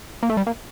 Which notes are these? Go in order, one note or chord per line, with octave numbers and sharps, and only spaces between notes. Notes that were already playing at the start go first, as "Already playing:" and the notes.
A#3
A3
G3
A#3